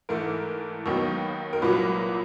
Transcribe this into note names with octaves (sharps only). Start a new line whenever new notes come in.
G#2 E3 A3 A#4
D#2 D#3 F#3 B3
A#4
C2 A#2 F#3 A#3 B4